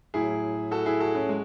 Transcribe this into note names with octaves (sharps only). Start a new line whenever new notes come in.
A2 F#3 E4 G#4
F#4 A4
E4 G#4
F#4 A4
C#4 E4
G#3